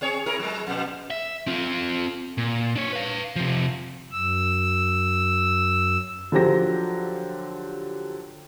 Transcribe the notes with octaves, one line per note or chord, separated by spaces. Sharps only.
C4 G#4 C#5
E4 G#4 A#4
F#3 G#3
F2 B2
E5
C4 F4
A#2
D4 C#5
B4 F5
C3 F3
F#2 E6
D3 F3 F#3 G4 A#6